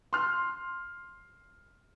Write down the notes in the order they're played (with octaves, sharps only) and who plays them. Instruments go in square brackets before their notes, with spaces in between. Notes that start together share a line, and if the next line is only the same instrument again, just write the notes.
[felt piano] C6 F6